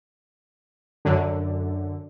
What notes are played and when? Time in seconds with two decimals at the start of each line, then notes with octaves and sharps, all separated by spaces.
1.05 F#2 D3